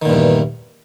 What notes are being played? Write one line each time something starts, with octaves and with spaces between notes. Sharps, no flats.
E2 G2 A#2 D#3